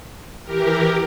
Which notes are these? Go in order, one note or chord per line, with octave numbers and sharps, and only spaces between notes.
E3 G4 A#4